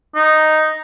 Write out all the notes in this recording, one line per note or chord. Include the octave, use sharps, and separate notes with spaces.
D#4